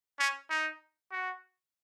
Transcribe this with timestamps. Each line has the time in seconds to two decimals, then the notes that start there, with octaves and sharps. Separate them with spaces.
0.19 C#4
0.50 D#4
1.12 F#4